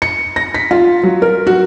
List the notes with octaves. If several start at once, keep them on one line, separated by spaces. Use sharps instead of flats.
C#7
A#6
B6
F4
F#3
A#4
F#4